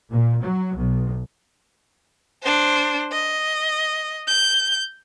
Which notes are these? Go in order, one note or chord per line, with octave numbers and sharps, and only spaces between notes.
A#2
F#3
B1
D4 C5
D#5
G6